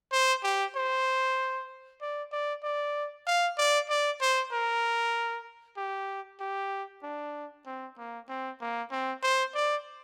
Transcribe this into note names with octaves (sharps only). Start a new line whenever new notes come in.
C5
G4
C5
D5
D5
D5
F5
D5
D5
C5
A#4
G4
G4
D4
C4
A#3
C4
A#3
C4
C5
D5